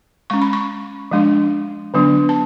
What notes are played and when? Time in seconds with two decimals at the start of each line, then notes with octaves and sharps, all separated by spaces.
0.30 G#3 C#4 C#6
0.42 B5
0.53 C#6
1.11 F3 G#3 D4
1.94 D3 F#3 B3 D4
2.29 A5